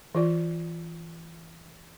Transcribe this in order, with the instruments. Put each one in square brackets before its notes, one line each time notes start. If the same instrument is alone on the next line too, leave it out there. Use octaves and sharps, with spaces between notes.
[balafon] E3 F4 D5